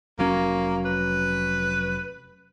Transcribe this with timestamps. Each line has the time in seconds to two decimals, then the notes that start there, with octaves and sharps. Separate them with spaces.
0.19 F1 F#3 A#3 C#4
0.85 B4